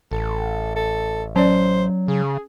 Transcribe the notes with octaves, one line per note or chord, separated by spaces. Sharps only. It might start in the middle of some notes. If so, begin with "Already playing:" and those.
A1 A4
A4
F#3 C#4 C5 D5
C#3 G#4